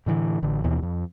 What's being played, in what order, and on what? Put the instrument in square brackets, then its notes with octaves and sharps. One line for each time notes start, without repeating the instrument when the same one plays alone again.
[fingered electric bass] A2 D3 E3
A1 D3
D#2 B2 E3
F2